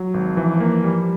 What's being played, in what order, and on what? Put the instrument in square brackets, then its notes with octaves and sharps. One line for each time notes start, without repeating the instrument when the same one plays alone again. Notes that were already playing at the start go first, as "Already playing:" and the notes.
Already playing: [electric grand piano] F#3
G#1
[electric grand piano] E3 [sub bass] F3
[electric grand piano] A#3
G3